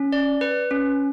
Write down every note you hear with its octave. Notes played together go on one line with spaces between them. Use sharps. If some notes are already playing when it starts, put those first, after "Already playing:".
Already playing: C#4
D5
B4
C#4